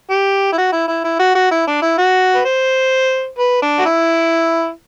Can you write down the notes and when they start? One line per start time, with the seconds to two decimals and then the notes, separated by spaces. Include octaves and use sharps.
0.10 G4
0.52 E4
0.58 F#4
0.72 E4
0.88 E4
1.04 E4
1.19 F#4
1.35 F#4
1.51 E4
1.67 D4
1.82 E4
1.98 F#4
2.35 B4
2.45 C5
3.38 B4
3.62 D4
3.78 F#4
3.85 E4